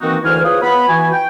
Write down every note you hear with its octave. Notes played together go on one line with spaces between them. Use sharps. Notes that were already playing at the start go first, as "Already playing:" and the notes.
D#3 E3 A#3 C4 D#4 F#4
D2 E3 E4 C5 G#5 F6
F4 G#4 B4 C#5 D#6
B3 B5
E3 F#4 G#5
G5